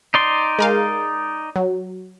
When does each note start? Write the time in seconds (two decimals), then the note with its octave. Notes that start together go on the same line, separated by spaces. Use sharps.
0.14 D#4 D5 C6
0.59 G#3 A#4 F5
1.56 F#3